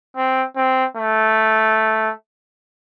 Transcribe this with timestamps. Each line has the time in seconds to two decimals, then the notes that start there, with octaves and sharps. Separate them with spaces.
0.16 C4
0.57 C4
0.97 A3